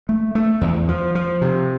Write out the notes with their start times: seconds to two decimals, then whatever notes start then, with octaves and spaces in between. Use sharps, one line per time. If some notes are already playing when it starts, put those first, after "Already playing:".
0.09 A3
0.35 A3
0.61 E2
0.88 F3
1.15 F3
1.41 C3